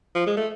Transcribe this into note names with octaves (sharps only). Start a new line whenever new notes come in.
F3
G#3
A3